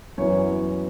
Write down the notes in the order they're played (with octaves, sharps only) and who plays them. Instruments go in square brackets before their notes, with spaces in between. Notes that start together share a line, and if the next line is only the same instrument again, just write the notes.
[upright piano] F#2 E3 B3 C#5